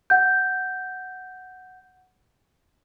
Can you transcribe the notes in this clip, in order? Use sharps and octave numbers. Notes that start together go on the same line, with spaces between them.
F#5 G6